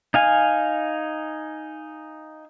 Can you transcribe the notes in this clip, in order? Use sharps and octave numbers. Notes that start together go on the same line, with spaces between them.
D#4 F5 G#5